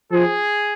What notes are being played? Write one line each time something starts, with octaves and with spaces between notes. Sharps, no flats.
F3 G#4